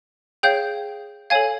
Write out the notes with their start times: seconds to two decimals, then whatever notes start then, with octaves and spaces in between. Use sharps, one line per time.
0.43 G#4 C#5 F5 G5 G6
1.30 A4 C#5 F5 G#5 G#6